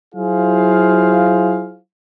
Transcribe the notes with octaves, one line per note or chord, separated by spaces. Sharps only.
F#3 E4 F4 G#4 C5 F5